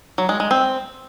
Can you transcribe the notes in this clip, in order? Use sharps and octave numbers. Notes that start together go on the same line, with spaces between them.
F#3
G#3
G#3
C4